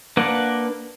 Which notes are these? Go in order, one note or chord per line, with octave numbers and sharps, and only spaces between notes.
A#3 D4 B4 F#5 D6